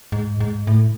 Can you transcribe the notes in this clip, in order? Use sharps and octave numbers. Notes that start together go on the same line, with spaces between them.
G#2
G#2
A2